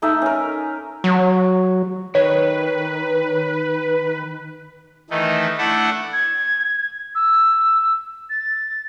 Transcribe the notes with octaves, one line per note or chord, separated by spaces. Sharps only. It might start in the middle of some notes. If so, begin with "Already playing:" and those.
A3 D#4 E5 A5
C#4 A#4
F#3
D#3 B4 C#5
D#3 E3 A3 D#4
A3 D4 E4 A4 F#5
G#6
E6
A6